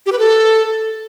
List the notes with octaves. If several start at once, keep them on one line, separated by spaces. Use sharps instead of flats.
G4
B4
A4